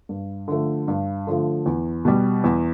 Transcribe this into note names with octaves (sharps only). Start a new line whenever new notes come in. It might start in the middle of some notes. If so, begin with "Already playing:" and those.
G2
D3 F3 A3
G2
D3 F3 A3
E2
B2 G3
E2